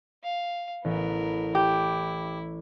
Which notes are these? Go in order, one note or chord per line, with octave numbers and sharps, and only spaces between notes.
F5
A1 B3 A#4
E4 G4